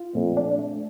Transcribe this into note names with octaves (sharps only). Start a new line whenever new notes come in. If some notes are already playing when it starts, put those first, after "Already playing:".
Already playing: F4
F2 A#2
D4
A3